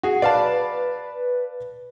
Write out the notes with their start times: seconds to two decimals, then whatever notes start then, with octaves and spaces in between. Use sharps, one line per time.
0.03 F#4 G#4
0.22 B4 D5 F5 A5